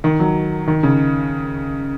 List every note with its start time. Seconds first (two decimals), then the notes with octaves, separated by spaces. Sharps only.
0.04 D#3
0.20 F#3
0.68 D#3
0.83 C#3